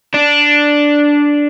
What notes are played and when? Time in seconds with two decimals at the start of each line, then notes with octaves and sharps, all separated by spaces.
0.14 D4